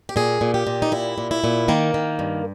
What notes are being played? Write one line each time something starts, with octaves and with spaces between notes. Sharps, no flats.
G4
A#2 G#4
A#2
G4
A#2
D#4
A#2 E4
A#2
E4
A#2
D#3 A#3
D#3
G2